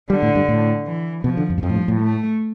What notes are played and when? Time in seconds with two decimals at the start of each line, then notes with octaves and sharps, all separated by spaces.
0.10 D3 G3
0.22 A2
0.35 G2
0.48 A2
0.86 E3
1.24 B2 F3
1.37 D3
1.50 F2
1.58 G2
1.63 F2 F3
1.69 A2
1.76 G2
1.88 A2
2.01 A3